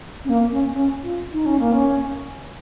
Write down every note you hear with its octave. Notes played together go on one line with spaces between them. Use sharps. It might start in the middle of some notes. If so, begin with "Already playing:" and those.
C#4
A#3
C#4
C#4
F4
D#4
C#4
A#3
C#4